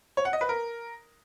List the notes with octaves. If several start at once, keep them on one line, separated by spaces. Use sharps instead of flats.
C#5
F#5
D#5
B4
A#4